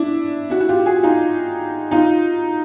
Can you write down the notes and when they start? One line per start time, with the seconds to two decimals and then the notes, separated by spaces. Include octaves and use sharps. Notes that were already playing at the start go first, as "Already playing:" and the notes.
Already playing: D4 E4
0.50 E4 F#4
0.60 F#4
0.69 F4 G4
0.86 F#4 G#4
1.03 D#4 F4
1.91 D#4 F4